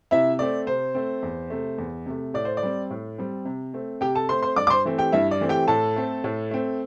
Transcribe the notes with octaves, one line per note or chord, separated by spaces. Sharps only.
C3 E4 E5
A3 C4 D5
C3 C5
A3 C4
E2
C3 A3
E2
C3 A3
A2 D5
C5
D5
G3 C4
A2
G3 C4
C3
A3 C4
C3 G4 G5
A4 A5
A3 C4 C5 C6
C5 C6
G2 D5 D6
D6
C5 C6
E3 A3 C4
G4 G5
G2 E4 E5
D5
E3 A3 C4
G4 G5
A2 A4 A5
A3 C4
A2
A3 C4